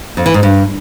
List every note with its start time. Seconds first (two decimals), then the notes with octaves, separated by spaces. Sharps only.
0.17 F2
0.26 E3
0.34 G#2
0.43 G2